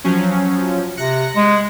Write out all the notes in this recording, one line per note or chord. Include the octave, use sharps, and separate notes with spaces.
F3 F#3 C#4
C3 F#6 A#6 C#7
G#3